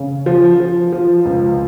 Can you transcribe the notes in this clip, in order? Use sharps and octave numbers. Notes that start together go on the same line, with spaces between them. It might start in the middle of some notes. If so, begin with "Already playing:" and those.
Already playing: C#3
F3
F3
F3
C#2